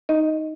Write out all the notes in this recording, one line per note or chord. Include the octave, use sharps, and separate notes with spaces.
D#4 D#5